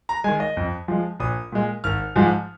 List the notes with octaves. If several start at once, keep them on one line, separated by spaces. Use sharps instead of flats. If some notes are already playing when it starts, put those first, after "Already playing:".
A#5
D#3 G#3 G#5
D#5
F2
F3 G#3
A#1 D#6
A#2 G#3
G#1 F6
G#2 F3 G#3